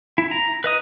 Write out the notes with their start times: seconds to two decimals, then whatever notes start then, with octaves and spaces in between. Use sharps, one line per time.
0.18 E4
0.31 A#5
0.64 B4 D#5 D#6